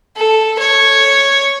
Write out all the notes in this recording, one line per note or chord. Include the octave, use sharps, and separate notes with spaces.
A4
C#5